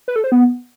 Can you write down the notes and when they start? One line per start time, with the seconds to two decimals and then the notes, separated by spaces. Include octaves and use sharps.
0.08 B4
0.16 A4
0.24 C5
0.32 B3